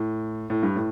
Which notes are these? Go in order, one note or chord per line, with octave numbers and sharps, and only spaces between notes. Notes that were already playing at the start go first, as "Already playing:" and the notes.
Already playing: A2
A2
G2
A2